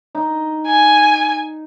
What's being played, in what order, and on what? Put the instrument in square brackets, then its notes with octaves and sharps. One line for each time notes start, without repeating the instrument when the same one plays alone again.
[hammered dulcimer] D#4
[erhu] G#5